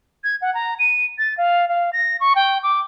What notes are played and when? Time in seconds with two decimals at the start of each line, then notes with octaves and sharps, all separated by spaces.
0.24 G#6
0.42 F#5
0.54 A#5
0.79 D#7
1.18 A6
1.38 F5
1.69 F5
1.93 A#6
2.20 C#6
2.35 G5
2.63 D6